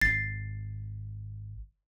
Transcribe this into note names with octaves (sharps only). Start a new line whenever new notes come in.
G#1 A6 C7